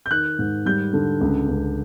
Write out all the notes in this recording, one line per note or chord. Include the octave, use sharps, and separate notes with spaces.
G6
D#3 F#6
G#2
G3 G6
D3
C#2
C#2